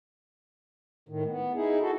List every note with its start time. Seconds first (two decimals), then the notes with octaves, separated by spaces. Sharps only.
1.09 A2 D#3
1.28 B3
1.54 D#4 E4 G#4
1.81 F#4 A4